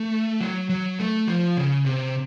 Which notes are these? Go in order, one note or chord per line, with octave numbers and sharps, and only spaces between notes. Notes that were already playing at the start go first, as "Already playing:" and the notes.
Already playing: A3
F#3
F#3
A3
F3
C#3
C3